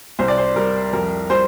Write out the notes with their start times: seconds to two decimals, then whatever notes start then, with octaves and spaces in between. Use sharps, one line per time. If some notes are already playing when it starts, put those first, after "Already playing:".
0.19 C2 C5
0.28 D5
0.38 C5
0.56 G3 A#4
0.93 F2 A#4
1.30 G3 C5